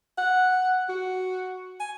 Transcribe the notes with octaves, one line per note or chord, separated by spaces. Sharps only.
F#5
F#4
G#5